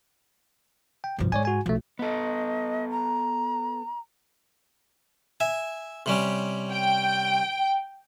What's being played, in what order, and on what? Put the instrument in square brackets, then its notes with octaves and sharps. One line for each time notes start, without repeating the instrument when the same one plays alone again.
[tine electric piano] G5
[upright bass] B1 G2 [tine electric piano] C3 F3
[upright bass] G#2 [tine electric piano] C#5 D5 G#5
[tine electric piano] F#4 G#5
[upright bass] B1 [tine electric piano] F3 A3
[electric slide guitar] B3 A4 [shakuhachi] D#5
[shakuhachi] A#5
[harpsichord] E5 G#5
C3 G3 C#4
[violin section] G5